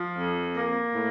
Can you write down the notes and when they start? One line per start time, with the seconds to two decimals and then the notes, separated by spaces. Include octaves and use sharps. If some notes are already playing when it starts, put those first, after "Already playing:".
Already playing: F3
0.16 F2
0.56 A#3
0.95 A2